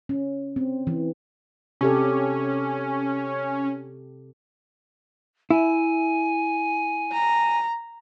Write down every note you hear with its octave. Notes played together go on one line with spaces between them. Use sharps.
C#4
C4
E3
C3 C#4 G4 A4
E4 G#5
A#5